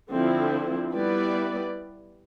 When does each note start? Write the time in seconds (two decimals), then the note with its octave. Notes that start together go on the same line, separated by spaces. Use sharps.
0.11 D3 F3 C4 E4
0.92 G3 B3 E4 B4 D5